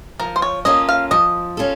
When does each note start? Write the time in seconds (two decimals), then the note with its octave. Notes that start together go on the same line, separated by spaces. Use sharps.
0.20 F3 A#4
0.36 C5
0.42 C#5
0.65 A#3 C#4 F4 A4 D#5
0.89 F5
1.11 F3 D#5
1.57 C#4 F4 A4